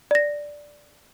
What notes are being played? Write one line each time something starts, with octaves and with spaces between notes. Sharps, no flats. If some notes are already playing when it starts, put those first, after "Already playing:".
D5 A#6